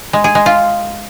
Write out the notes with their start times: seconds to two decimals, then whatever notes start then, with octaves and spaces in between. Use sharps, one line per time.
0.13 G#3
0.24 G#4
0.35 G#3
0.46 F4